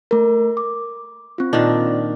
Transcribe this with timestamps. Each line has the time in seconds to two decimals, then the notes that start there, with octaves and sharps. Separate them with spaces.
0.11 A3 A#4
0.57 D6
1.38 C4 F4
1.53 A#2 D#3 D4